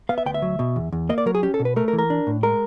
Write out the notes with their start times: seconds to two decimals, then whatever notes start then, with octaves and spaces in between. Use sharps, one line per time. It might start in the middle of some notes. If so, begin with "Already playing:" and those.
0.09 B3 F5
0.18 E5
0.26 D2 G5
0.34 E5
0.42 F#3
0.59 B2
0.76 E2
0.92 E2
1.09 A#3 D#5
1.18 D5
1.26 F#3 A#4
1.35 G#4
1.43 C#4 G4
1.54 A4
1.60 B2
1.65 B4
1.76 A3 A#4
1.88 A#4
1.93 E3
1.98 A#4
2.10 D4
2.27 A2
2.43 G#3 A#4